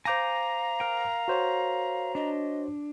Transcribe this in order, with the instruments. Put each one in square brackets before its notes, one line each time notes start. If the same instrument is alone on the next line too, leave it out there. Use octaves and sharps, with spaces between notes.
[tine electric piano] C5 D6 A#6 [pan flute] F5 [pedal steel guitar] G#5 G6 [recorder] A#5
[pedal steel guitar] A#4 G5
[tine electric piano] F#4 C5 C#5
[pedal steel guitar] D4 [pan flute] D#5